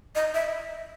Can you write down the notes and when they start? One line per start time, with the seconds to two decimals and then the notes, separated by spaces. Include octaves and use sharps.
0.15 D#5
0.34 E5